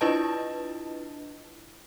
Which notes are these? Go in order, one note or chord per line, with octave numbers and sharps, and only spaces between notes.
D4 E4 F4 B4 D#5 A5